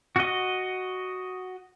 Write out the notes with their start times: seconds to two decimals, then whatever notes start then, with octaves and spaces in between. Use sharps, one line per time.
0.16 F#4 D#5